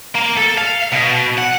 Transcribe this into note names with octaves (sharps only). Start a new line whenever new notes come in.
A#3
A4
F5
B2
F#5